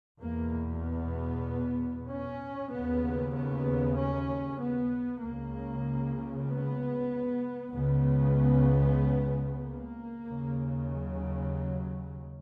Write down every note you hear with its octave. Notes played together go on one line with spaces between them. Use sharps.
E2 B2 A#3
B3
C#4
D#2 C#3 B3
B3
C#4
B3
C#2 C#3 A#3
B3
C#2 C#3 B3
A#3
D#2 C#3
F#3